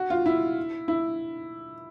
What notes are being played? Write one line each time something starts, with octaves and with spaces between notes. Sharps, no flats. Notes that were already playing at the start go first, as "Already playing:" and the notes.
Already playing: F#4
F4
E4
E4